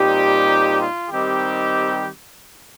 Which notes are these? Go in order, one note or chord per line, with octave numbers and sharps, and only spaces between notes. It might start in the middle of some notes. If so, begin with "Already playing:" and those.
Already playing: A#2 G3 C4 D#4 G4
F4
D#3 G3 C4 D#4 G4